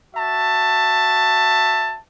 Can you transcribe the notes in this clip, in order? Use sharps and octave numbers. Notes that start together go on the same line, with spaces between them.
F#4 E5 A5